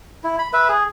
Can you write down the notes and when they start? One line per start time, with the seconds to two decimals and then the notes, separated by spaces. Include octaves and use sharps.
0.24 E4
0.39 B5
0.53 B4 E5
0.69 G#4